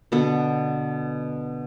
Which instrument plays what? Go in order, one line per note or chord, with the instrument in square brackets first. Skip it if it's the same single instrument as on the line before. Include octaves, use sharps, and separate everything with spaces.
[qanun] B2 D3 B3